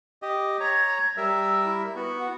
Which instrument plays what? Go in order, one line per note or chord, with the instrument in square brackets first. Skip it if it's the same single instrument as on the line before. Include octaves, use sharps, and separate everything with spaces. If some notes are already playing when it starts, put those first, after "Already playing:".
[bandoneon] G4 D#5
[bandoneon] C#5 A#5 [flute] G#6
[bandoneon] G3 A#4 E5 [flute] E6
[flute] E4
[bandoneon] B3 F#4
[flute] F#5